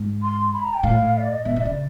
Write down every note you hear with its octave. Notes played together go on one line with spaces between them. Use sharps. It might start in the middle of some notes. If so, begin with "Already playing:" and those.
Already playing: G#2
C6
B5
A#5
G5
A2 F5
D5
D#5
B2 E5
C3
C#3 D5